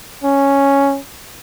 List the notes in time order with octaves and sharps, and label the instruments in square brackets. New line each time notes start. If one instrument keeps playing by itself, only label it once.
[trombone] C#4